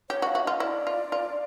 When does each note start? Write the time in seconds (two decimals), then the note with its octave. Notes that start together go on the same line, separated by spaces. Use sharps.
0.10 G4 C#5
0.22 F#4
0.27 F5
0.35 F#4 E5
0.43 F4 D#5
0.60 E4 D5
0.87 F4
1.12 F4